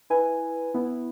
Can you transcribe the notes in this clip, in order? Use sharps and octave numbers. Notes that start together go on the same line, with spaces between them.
E4 B4 G#5
B3 E4